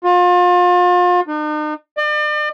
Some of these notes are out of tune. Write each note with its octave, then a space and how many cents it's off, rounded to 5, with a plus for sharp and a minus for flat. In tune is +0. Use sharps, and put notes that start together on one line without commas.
F4 +35
D#4 -45
D5 +40